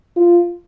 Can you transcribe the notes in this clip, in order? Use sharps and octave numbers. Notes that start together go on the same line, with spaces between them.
F4